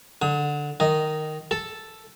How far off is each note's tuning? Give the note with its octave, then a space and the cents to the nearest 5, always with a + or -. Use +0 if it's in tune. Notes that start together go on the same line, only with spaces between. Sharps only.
D3 +0 D#6 +40
D#3 -10 D#5 +0
A4 +0 A5 +0